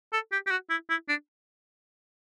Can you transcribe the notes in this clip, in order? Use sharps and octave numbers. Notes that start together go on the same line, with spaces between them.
A4
G4
G4
F#4
E4
E4
D4